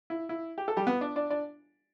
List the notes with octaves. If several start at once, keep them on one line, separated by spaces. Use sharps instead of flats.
E4
E4
G4
A4
G3 G4
B3 B4
D4 D5
D4 D5
D4 D5